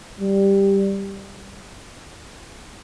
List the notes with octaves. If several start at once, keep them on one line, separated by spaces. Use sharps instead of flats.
G3